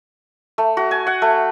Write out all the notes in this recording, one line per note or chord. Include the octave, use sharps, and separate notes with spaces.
A3
F#4
G#5
F#5
A3